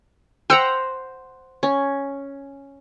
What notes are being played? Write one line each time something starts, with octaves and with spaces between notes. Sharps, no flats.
C5 F#5 G5 A#5 E6 C#7
C#4